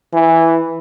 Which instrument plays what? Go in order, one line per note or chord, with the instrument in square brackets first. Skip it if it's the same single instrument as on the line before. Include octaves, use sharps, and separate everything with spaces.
[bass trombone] E3